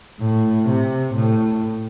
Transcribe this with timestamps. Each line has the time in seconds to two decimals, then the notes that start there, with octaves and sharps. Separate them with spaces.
0.20 A2
0.67 C3
1.13 A2